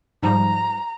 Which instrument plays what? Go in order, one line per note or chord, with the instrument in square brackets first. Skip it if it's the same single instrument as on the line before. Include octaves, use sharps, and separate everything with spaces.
[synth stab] G#2 F3 G3 [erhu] A#5